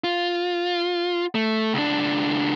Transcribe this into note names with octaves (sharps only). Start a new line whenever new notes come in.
F4
A3
C#2 D4